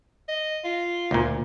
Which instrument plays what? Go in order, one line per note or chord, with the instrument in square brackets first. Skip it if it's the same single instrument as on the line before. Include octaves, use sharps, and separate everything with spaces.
[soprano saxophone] D#5
F4
[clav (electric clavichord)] D2 A#2